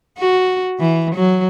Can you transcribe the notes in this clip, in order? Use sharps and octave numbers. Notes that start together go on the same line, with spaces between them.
F#4
E3
F#3